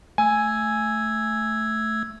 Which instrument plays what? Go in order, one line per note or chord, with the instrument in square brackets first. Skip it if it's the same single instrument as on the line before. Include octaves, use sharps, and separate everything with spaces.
[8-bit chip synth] A3 E6 G#6 [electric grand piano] G#5